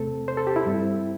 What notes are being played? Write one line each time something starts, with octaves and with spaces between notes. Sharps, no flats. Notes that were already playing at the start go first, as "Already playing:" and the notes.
Already playing: E2 C3 A3 C4 A4
C5
A4
G4
E4
G2 G3 C4